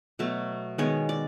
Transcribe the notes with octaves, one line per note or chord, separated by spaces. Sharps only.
B2 F#3 A3
D#3 G#3 B3 C#5
D5